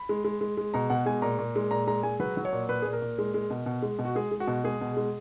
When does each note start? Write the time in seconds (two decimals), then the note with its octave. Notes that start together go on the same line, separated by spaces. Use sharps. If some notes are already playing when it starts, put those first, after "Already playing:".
Already playing: B5
0.09 G#3
0.25 G#3
0.41 G#3
0.57 G#3
0.74 B2 A#5
0.90 B2 F#5
1.06 G#3 G#5
1.22 A#2 A#5
1.38 A#2
1.56 G#3
1.71 A#2 A#5
1.87 G#3 A#5
2.03 G#3 G#5
2.20 F#3 B4
2.37 F#3
2.45 C#5
2.53 A#2
2.69 A#2 B4
2.82 A#2 G#4
2.93 A#4
3.02 A#2
3.18 G#3
3.34 G#3
3.50 B2
3.66 B2
3.82 G#3
3.99 B2
4.05 F#4
4.15 G#3 G#4
4.31 G#3
4.40 F#4
4.47 B2
4.64 G#3 G#4
4.81 B2
4.97 G#3